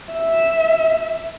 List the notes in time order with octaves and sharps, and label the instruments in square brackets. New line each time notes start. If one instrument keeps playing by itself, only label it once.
[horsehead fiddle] E5